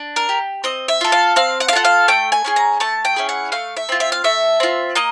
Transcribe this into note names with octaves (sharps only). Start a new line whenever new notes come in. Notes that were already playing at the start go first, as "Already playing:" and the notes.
Already playing: D4
A#4
G4
C4 D#5
E5
F4 A4
F5
C4 F5
F#5
F5
F4 A4 F#5
F5
A3 G5
G#5
C#4 E4 G#4
A#5
A3 A5
G5
C#4 E4 G#4
F#5
A3 F5
E5
C4 F4
E5
F5
A3 E5
C4 F4
A#3 D#5